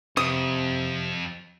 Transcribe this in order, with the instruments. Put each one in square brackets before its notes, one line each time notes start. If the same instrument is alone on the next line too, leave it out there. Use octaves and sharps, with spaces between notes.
[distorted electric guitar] F2 [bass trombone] C3 [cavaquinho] D#6